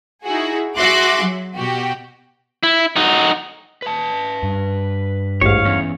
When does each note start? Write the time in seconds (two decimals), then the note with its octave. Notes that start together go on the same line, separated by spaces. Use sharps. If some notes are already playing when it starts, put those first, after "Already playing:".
0.24 D#4 E4 F#4 G#4
0.76 F#4 G#4 E5 C6 D6 F#6
1.22 F#3
1.56 B2 F#4 G4
2.63 E4
2.96 D#4 F#4
3.82 B4 A5
4.43 G2
5.41 A1 D#2 G#2 C#5 F5
5.66 E2 C#4